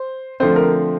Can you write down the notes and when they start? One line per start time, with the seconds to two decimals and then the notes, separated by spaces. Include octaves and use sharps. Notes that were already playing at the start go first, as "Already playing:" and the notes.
Already playing: C5
0.40 D3 F3 A3 C4 C5
0.56 A#4